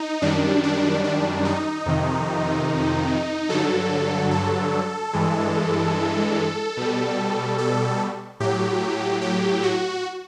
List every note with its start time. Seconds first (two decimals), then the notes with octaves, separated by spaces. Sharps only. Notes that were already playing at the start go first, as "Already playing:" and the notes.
Already playing: D#4
0.22 F#2 D#3 G3 D4
0.63 D4
1.04 D4
1.45 D#4
1.86 F2 C3 D#3
3.49 G2 D3 F#3 A4
4.31 A4
5.13 G2 E3 G#3
6.77 B2 G3
7.58 A4
8.40 A2 F#3 G4
9.21 G4
9.63 F#4